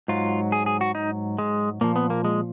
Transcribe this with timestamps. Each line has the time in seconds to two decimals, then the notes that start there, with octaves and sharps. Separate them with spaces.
0.08 G#2 F#3 F4
0.52 G#4
0.66 G#4
0.81 F#4
0.95 D#4
1.38 G#3
1.81 A#2 F3 A#3
1.96 B3
2.10 A#3
2.25 G#3